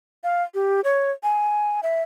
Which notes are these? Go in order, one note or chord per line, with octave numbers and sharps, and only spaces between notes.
F5
G4
C#5
G#5
E5